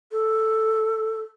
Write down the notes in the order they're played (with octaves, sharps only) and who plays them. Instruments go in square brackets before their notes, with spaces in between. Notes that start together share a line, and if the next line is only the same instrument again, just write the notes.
[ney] A4